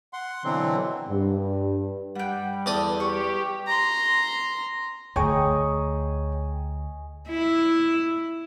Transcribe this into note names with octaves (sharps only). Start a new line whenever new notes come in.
F#5 C6
B2 D3 E3 F#3 C4
G2
G3 F#5 G5
E2 A4 D5 D#6
G4 C#6
A#5 C6
D2 G#4 C#5 D#5 G5 A#5 C#6
E4